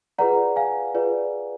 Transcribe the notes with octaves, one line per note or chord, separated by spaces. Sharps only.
F4 G#4 B4 D5 F#5 A#5
F5 G#5
F4 G#4 B4 D5